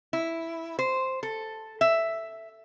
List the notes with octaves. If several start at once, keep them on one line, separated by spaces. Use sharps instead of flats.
E4
C5
A4
E5